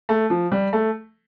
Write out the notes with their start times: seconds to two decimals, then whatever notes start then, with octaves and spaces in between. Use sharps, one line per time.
0.09 A3
0.30 F3
0.52 G3
0.73 A3